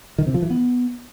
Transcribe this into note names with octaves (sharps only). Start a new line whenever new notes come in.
D#3
C3
F3
E3
B3